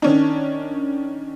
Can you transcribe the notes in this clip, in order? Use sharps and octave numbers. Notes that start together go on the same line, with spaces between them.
D#3 C#4 D4